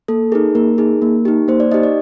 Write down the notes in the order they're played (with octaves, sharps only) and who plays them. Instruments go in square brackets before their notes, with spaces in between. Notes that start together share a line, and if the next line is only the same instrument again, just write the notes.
[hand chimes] A#3 A4
D#4 G#4 A#4
A#3 A#4
D#4 G#4
A#3
D#4 G4
A#3 C5
D5
D#4 G4 D#5
D5